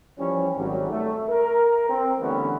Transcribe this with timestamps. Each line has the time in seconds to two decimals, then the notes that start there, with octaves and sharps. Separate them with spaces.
0.19 E3 F3 G3 C#4
0.57 G#1 F#3 G3
0.90 A3
1.29 A#4
1.89 C4
2.20 D3 E3 G3 A3 B3 C#4